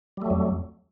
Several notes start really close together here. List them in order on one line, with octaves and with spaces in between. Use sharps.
G3 A3 F#3 F2